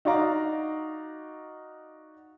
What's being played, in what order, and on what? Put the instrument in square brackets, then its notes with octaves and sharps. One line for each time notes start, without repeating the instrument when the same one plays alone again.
[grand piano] D#4 F#4 D5 F5 A#5